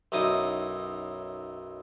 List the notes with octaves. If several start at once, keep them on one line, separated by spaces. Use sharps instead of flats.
B1 F#2 D#4 E4 D#6